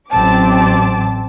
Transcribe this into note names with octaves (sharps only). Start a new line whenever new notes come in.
A1 F#3 C4 A5 D6